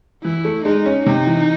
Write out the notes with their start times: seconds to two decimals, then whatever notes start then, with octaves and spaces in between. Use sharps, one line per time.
0.24 E3 E4
0.45 A3
0.65 G#3 D#4
0.86 C#4
1.06 C3 D#4
1.27 E3